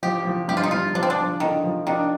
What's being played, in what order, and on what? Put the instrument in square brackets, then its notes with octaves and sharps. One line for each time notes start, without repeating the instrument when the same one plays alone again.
[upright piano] F3 [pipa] G4
[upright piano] F3
[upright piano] G2 [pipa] G4
[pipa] F4
D#4
[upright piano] G2 [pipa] F4
[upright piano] F3 [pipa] D4
[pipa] C4
D4
[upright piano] F3
[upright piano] D3 [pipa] D#3
[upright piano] F3
[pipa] D#3 [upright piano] D4